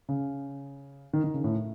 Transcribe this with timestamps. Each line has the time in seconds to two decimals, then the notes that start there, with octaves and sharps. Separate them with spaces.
0.09 C#3
1.13 D#3
1.24 D#3
1.34 C#3
1.44 A2